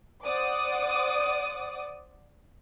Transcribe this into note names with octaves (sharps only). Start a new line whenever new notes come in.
C5 D5 F#5 D6 D#6